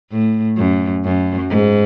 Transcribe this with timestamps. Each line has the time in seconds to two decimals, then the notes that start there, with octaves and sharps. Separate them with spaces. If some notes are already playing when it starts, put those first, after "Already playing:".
0.11 A2
0.57 F#2
1.04 F#2
1.50 G#2